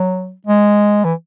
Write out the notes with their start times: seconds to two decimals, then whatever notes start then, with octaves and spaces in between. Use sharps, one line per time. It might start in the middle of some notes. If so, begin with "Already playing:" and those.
Already playing: F#3
0.46 G#3
1.04 E3